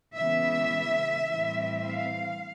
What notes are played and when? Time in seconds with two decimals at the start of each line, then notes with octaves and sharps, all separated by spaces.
0.16 C#3 E3 G#3 B3 E5
1.29 A2 E3 G3 C4
1.86 F5